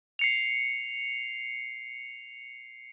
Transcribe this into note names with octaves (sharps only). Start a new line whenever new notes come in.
C7 C#7 F7